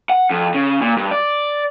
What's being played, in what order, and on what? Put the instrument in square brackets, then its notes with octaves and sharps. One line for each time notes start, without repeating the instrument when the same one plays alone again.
[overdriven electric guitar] F#5
F2
C#3
A#2
G2
D5